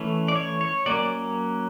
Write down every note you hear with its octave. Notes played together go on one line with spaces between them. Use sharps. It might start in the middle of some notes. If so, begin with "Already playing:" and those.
Already playing: E3 A3 C#4
D5
C#5
C#5
F#3 A#3 C#4 D5